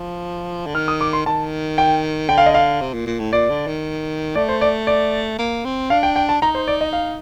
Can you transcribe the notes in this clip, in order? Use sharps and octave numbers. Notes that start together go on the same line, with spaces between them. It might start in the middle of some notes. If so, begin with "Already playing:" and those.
Already playing: F3
D3
D#3 F6
D#6
D6
C6
D#3 A5
G5
D3 G5
F5
D#5
F5
C3
A#2
A#2
A2
A#2 D5
D3
D#3
A3 D5
C5
D5
D5
A#3
C4
D4 F5
G5
G5
A5
D#4 A#5
C5
D5
D#5
F5